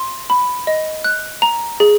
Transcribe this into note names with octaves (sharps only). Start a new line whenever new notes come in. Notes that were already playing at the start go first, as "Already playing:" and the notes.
Already playing: C6
B5
D#5
F#6
A#5
G#4